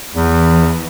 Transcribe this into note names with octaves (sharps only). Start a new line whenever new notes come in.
E2 E3